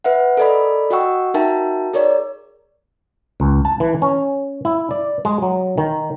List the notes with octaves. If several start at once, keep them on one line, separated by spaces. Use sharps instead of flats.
B4 E5 F#5
A4 A#4 D5 D#5 B5
F#4 D#5 F#5 G5 C#6 E6
D#4 F#4 A#4 E5 G5 A5
G#4 A#4 C#5 D5
C#2
A5
E3
C#4
E4
D5
G#3
F#3
D#3